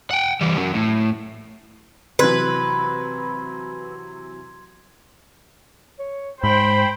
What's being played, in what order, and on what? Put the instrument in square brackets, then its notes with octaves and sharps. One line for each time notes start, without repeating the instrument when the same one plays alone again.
[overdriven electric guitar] F#5 G5
E3 G3
F#3 C#4
A2
[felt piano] C3 E3 F#3 [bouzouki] B4 [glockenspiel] C6 G#6
[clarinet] C#5
[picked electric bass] G#2 [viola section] C5 G5 [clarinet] B5